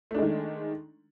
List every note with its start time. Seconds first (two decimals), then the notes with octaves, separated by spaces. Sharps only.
0.11 A3
0.14 D4
0.18 G#3
0.22 D#3